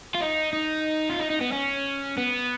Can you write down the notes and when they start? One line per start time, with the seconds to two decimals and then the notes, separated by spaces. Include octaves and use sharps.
0.15 F4
0.21 D#4
0.53 D#4
1.10 F4
1.19 D#4
1.30 D#4
1.41 B3
1.52 C#4
2.18 B3